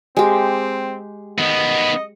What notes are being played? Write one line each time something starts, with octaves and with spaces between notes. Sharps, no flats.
G#3 C4 G4
D#3 B3 D#5